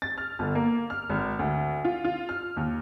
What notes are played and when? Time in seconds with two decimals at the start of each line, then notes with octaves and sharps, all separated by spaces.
0.02 A6
0.18 F6
0.39 G1
0.55 A#3
0.90 F6
1.10 G#1
1.39 D2
1.85 F4
2.04 F4
2.29 F6
2.57 D#2